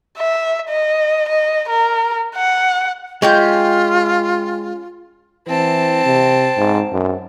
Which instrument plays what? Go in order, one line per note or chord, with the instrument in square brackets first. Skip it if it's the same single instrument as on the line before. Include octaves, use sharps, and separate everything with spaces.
[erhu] E5
D#5
D#5
A#4
F#5
[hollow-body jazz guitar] G#3 [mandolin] C#4 G4 G6 [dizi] F4
[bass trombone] E3 [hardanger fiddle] C4 A5
[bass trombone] C3
G#2
F#2